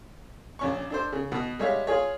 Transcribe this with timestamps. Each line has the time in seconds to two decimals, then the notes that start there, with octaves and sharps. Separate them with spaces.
0.59 A#1 C#4 C#6
0.90 D4 A4 C5
1.12 C#3
1.32 B2 F#5
1.59 G3 G#3 C#5 E5 F5
1.87 F4 G#4 C#5